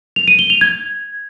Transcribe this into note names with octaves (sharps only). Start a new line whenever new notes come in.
F7
D#7
G7
F7
G#6